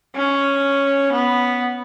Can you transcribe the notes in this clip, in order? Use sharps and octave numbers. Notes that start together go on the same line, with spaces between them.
C#4
B3